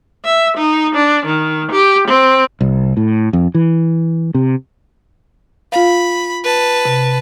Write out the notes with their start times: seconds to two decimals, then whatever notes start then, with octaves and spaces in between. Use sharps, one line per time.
0.25 E5
0.57 D#4
0.95 D4
1.26 D#3
1.72 G4
2.08 C4
2.61 C2
2.97 A2
3.33 F2
3.55 E3
4.34 C3
5.72 F4 F5 B5
6.44 B4 A5
6.85 C3